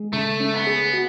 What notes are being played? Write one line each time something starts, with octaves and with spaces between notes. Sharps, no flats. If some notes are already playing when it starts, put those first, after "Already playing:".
Already playing: G#3 G#4
C#3 A3
C#4
B3
G#4
F#4